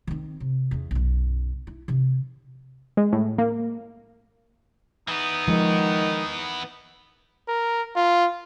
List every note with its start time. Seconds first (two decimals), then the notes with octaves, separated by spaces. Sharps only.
0.07 D#3 C4
0.40 C3
0.71 E2 C#4
0.91 B1 F#2
1.67 E4
1.88 C3 E3
2.97 G#3
3.12 A2
3.38 A#3
5.08 E3 B3 D#4
5.48 D#3 F3 G#3
7.48 A#4
7.96 F4